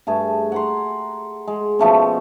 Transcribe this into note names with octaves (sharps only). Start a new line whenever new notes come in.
G2 A3 G#4 A5
F#5 A#5 C6
G#3
B2 F3 A3 C#4